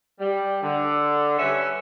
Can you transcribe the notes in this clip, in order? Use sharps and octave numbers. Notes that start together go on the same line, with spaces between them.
G3
D3
G3 C#4 A4 B4 E5